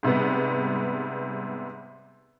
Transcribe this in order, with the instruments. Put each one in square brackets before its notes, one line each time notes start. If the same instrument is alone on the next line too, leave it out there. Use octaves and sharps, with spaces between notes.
[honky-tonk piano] G#2 C3 G3 B3